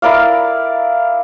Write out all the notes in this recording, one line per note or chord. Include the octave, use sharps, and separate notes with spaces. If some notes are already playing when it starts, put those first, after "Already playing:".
E4 A#4 D5 F5